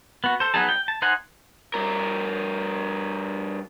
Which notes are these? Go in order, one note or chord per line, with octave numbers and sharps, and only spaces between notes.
B3 F#4
A4 C5
F#3 B3 D#4 G#4 A5
G5
A5
D#4 C5 D#5 F#5 G#5
G2 A#4